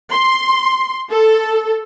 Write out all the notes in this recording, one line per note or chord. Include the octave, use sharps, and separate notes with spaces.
C6
A4